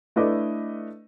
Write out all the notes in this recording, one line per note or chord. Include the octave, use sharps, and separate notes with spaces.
A3 D4 E4 B4 D#5 D6